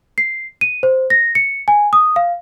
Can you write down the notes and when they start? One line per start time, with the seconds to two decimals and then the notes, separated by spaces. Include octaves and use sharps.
0.18 C7
0.61 D#7
0.83 C5
1.10 A#6
1.35 C#7
1.68 G#5
1.93 D#6
2.16 F5